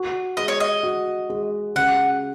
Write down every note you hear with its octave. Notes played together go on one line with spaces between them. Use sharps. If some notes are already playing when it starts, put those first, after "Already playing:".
Already playing: F#4
G#3 D#5
C#5
D#5
F#4
G#3
C#3 F#5